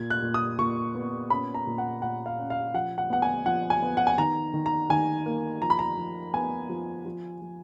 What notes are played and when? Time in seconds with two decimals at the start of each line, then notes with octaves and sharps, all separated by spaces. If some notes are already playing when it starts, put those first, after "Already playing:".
Already playing: A#2 G#6
0.10 F#6
0.22 A#2
0.34 D#6
0.59 A#2 C#6
0.95 B3
1.30 C#4 B5
1.55 A#5
1.67 A#2
1.78 F#5
2.02 A#2 F#5
2.26 F5
2.38 C#4
2.50 F5
2.74 F3 F#5
2.98 F#5
3.10 B3 F#5
3.22 G#5
3.46 F3 F#5
3.70 G#5
3.82 B3
3.97 F#5
4.07 G#5
4.18 D#3 A#5
4.54 D#3
4.66 A#5
4.90 D#3 G#5
5.26 A#3
5.61 F3 A#5
5.70 B5
5.79 A#5
5.97 F3
6.34 B3 G#5
6.69 F3
7.06 F3
7.42 F3